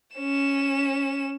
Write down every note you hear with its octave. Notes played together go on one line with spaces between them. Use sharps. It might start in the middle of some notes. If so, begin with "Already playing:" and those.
C#4 E7